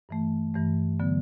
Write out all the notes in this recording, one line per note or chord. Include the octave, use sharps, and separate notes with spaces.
G2 E3 A3
G2 E3 A3
D3 F#3 B3